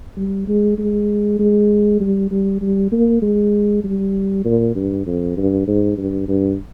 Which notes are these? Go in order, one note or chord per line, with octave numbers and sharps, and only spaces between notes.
G3
G#3
G#3
G#3
G3
G3
G3
A#3
G#3
G3
A#2
G2
F2
G2
G#2
G2
G2